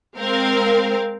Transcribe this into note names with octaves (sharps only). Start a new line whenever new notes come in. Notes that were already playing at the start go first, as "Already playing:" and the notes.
G#3 C4 A#4 F5